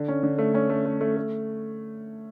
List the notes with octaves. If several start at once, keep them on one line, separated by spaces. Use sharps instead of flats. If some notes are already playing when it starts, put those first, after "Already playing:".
Already playing: D3
C#4
D3
A3
C#4
A3
A3
A3
A3